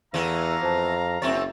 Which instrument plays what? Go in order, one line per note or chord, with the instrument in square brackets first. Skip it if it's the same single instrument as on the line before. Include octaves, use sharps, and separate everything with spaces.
[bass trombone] E2 [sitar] E3 A3 B3 [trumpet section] F5 A#5
[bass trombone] F2 [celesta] C5 A5
[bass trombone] F#1 [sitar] F#2 C4 C#5 [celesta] E5 A6